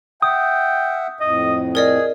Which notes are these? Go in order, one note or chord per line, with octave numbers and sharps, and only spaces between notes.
E5 F#5 G5 D#6
F2 A2 D#5
G#4 A#4 D5 D#5